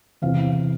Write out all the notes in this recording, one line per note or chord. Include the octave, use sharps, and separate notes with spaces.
E2 C3 E3 F5